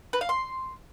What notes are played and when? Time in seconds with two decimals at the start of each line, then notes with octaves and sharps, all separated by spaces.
0.13 B4
0.21 F5
0.29 C6